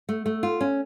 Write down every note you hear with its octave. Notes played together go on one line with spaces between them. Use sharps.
A3
A3
F4
C#4